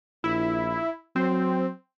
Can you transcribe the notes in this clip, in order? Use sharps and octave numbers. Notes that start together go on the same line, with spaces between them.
A#1 E4
F#3 C4